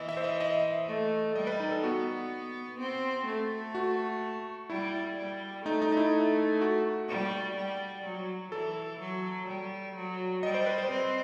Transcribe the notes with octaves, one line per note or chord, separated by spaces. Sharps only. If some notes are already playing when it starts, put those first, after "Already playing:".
Already playing: E3 D#5
E5
C5
D#5
D#5
A3
G3 D#5
B4
D#4
A4
B3 F#4
C4
A3
F#4
G3 E4
G3
A3 D#4
D#4
D#4
E4
F#4
G3
G3
F#3
E3 A4
F#3
G3
F#3
G3 D#5
C5
B4
C5
C4